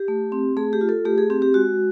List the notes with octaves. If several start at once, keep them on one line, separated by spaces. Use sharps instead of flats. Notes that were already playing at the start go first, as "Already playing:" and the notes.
Already playing: G4
A3
C4
A3 G#4
G4
F4
A4
A3 G4
G#4
C4 G4
G4
G#3 F#4